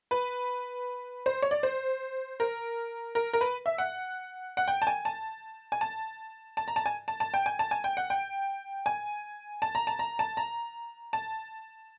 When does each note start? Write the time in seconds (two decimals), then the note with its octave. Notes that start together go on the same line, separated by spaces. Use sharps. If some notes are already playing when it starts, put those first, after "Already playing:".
0.11 B4
1.26 C5
1.42 C#5
1.51 D5
1.63 C5
2.40 A#4
3.15 A#4
3.33 A#4
3.41 B4
3.66 E5
3.78 F#5
4.57 F#5
4.68 G5
4.82 A5
4.87 G#5
5.05 A5
5.72 G#5
5.81 A5
6.57 A5
6.68 A#5
6.76 A5
6.86 G#5
7.08 A5
7.20 A5
7.34 G5
7.46 G#5
7.59 A5
7.71 G#5
7.84 G5
7.97 F#5
8.10 G5
8.86 G#5
9.62 A5
9.75 A#5
9.87 A5
9.99 A#5
10.19 A5
10.37 A#5
11.13 A5